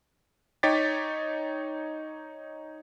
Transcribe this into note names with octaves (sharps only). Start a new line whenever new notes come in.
D#4 C#5 G5 D6 A6 B6